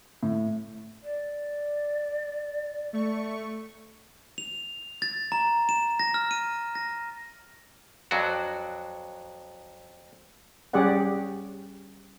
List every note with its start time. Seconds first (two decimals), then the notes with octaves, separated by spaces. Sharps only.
0.23 A2
1.03 D5
2.93 A3 C#6
4.38 F7
5.02 A6
5.32 A#5
5.69 E7
6.00 A#6
6.14 F6
6.31 D#7
6.75 A#6
8.11 F2 F#3 D4 F#4
10.73 G3 C#4 G4 G#4 D5 F#5